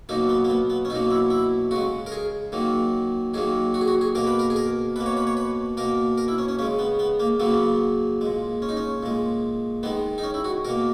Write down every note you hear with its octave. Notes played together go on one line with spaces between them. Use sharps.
B2 F#3 A#3 D#4
B3
A#3
B3
B3
C#4
B2 F#3 A#3 D#4
E4
E4
C#3 G#3 F#4
A#4
G#4
D#3 F#3 A#3
D#3 F#3 A#3 G#4
F#4
G#4
F#4
G#4
B2 A#3 A#4
B4
A#4
G#4
A#4
B2 A#3 B4
C#5
B4
C#5
B4
B2 A#3 A#4
A#4
E4
C#4
C#4
C#3 G#3 C#4
B3
B3
A#3
C#3 F#3 A#3 B3
A#2 G#3
C#4
D#4
C#4
A#2 G#3
D#3 G#3 B3
D#4
C#4
E4
F#4
B2 A#3 A#4